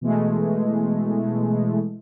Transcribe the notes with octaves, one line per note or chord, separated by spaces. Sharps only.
B2 E3 G#3 A3